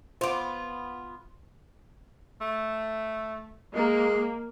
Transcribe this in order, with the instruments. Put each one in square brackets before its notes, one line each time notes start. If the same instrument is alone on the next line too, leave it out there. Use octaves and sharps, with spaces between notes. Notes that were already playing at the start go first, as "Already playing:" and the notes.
[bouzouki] B3 F4 [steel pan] C5 D6
[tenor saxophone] A3
[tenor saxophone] G#3 [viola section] A#3